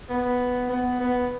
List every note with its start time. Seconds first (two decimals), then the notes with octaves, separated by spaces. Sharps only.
0.09 B3
0.70 B3
1.00 B3